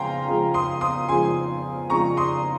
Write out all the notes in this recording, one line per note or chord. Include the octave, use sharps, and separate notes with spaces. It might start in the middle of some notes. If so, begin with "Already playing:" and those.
Already playing: C#3 F3 G#3 F5 G5 G#5 A#5 C6
C#3 F3 G#3
C6 D#6
C6 D#6
C#3 F3 G#3 G#5 C6
C#3 F3 G#3 A#5 C#6
C6 D#6